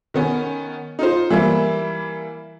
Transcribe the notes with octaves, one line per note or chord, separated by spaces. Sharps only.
D#3 B3 C#4
D#4 F4 C5
E3 G3 A#3 E4